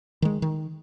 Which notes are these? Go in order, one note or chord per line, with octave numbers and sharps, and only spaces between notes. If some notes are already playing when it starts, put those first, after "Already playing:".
D#3 G#3
D#3